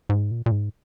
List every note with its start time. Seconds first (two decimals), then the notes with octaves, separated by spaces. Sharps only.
0.09 G#2
0.31 A#2
0.46 A#2
0.51 G#2